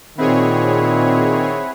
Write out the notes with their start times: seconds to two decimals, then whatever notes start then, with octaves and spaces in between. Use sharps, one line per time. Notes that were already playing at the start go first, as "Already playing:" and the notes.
0.18 A#2 D#3 C4 E4 G#4 C#5 E5 F#5